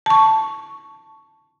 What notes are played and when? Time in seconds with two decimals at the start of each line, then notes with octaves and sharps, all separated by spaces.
0.06 A5 C#6